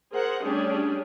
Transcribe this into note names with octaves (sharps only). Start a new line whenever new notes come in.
G#4 A#4 C5 F#5
G3 A3 C#4 D4 G4 G#4